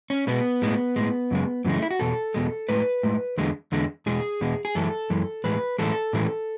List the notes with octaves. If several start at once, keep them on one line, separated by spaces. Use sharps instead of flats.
C#4
B2 G#3 B3
A2 G#3
A2 G#3
F#2 C#3 G#3
F#2 C#3 E3 G#3 B3
A3
E4
F#4
E2 B2 A4
E2 B2 G#3
A2 G#3 B4
A2 G#3
E2 D3 G#3
E2 D3 G#3
E2 B2 G#3 G#4
E2 B2 G#3
G#4
F#2 E3 G#3 A4
F#2 E3 G#3
A2 E3 G#3 B4
A2 E3 G#3 A4
A2 E3 G#3